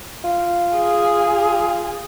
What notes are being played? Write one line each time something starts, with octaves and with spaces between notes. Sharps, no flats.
F4
G#4